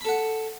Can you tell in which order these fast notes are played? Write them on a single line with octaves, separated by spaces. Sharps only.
B5 A4 F#5